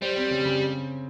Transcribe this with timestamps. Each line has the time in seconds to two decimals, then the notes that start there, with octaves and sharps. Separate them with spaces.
0.02 G3 C5
0.17 C4
0.31 C#3
0.45 C#3